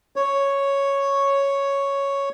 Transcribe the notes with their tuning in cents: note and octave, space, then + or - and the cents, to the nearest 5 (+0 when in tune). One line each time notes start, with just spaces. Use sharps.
C#5 +0